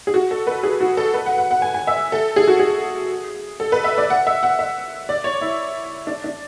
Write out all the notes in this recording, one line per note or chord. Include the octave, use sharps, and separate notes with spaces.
G#4
F#4
A4
B4
G#4
F#4
A4
B4
F#5
F#5
F#5
G#5
G#5
E5
A4
G#4
F#4
G#4
A4
B4
E5
D5
F#5
E5
F#5
E5
D5
C#5
E4
D4
D4